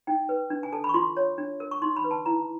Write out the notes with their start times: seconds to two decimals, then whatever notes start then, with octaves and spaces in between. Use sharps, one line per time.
0.07 D#4 G5
0.29 B4
0.50 D4
0.63 G#5
0.73 A4 A5
0.84 B5
0.89 C#6
0.94 F4 C6
1.17 C#5
1.38 D4
1.60 A#4
1.71 C#6
1.82 D#4 C6
1.97 B5
2.04 B4
2.11 A5
2.26 E4 A#5